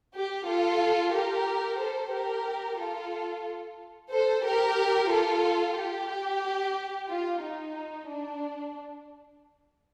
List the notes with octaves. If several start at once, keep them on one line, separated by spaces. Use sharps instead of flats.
G4
F4 A4
G4 A#4
A4 C5
G4 A#4
F4 A4
A4 C5
G4 A#4
F4 A4
G4
F4
D#4
D4